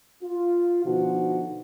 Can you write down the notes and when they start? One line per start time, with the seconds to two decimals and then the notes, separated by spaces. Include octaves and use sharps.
0.23 F4
0.85 B2 D3 F3 D#4 F#4